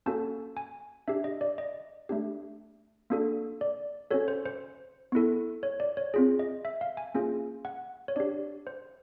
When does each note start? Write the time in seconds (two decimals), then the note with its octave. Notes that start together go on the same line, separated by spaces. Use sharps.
0.06 A#3 C#4 F#4 A4 A5
0.57 G#5
1.08 D4 G4 E5
1.24 D#5
1.41 D5
1.58 D#5
2.09 A3 D4 G4
3.10 A#3 D4 F#4 A4
3.61 D5
4.11 C#4 F#4 A4 C#5
4.28 C5
4.45 C5
5.12 B3 E4 A4
5.63 C#5
5.80 D5
5.97 C#5
6.14 C4 F4 G#4
6.39 D#5
6.65 E5
6.81 F5
6.97 G#5
7.15 A#3 C#4 F4 G#4
7.65 F#5
8.08 C#5
8.16 D4 G4 D5
8.67 C5